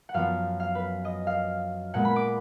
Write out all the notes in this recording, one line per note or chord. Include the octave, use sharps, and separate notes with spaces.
F#5
F#2 F3 B3 F5
F5
B4
D#5
F5
A#2 G#3 B3 F#5
B5
D6